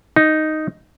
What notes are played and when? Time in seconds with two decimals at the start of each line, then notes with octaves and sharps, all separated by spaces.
0.16 D#4